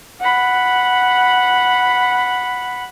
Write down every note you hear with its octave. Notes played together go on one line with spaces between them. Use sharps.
F#5 B5